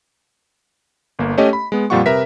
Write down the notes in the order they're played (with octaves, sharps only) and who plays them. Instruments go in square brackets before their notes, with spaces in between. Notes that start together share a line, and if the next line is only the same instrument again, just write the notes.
[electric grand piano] G1 A#3
A3 C#4 G4 C#5 D#5
B5
G#3 B3
F2 A#2 G3 F4 F#5 C#6
C3 A#4 B4 E5 B6